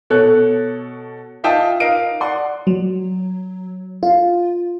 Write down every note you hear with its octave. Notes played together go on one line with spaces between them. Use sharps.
B2 A4 C#5 F#6
D#4 F4 E5 G5 A5 D#6
D#4 A#4 D#5 F5 D7
D5 F#5 C6
F#3
F4